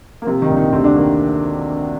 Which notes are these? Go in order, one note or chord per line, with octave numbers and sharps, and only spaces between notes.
A#3
C3 F3 C4
D#3 D#4
A#1
D#3 D#4
D2 C3 C4
D3 D4
D#3 A#3